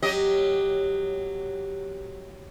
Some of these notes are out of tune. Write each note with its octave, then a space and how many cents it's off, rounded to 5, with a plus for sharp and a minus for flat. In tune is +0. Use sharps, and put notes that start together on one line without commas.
F#3 +0 G4 +0 D#5 +0